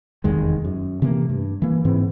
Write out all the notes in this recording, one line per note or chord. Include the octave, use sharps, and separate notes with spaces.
F1 E2 D#3 G#3
F#2
C3 E3 A3 A#3
G2
E3 A#3
G#2 E3 C4